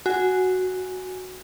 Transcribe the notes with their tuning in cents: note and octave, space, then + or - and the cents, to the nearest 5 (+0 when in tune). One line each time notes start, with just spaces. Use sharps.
F#4 +0 G#5 +0